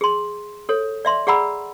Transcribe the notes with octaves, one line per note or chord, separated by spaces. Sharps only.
G#4 C6
A4 C#5
D5 E5 C6
G#4 D5 F#5 A#5 B5 E6